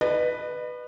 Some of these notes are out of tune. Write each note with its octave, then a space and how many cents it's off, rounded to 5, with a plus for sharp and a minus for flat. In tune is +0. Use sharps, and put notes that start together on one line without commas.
B4 +0 D#5 -45